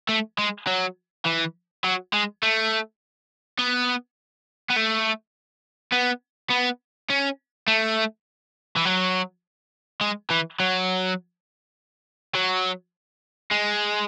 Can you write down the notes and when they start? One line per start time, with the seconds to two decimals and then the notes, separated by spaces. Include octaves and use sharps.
0.09 A3
0.38 G#3
0.67 F#3
1.26 E3
1.84 F#3
2.13 G#3
2.43 A3
3.59 B3
4.70 B3
4.77 A3
5.92 B3
6.50 B3
7.10 C#4
7.68 A3
8.76 E3
8.85 F#3
10.01 G#3
10.30 E3
10.60 F#3
12.35 F#3
13.51 G#3